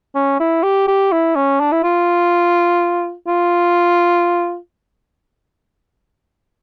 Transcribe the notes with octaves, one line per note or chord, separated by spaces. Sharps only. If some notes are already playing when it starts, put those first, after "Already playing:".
C#4
E4
G4
G4
E4
C#4
D4
E4
F4
F4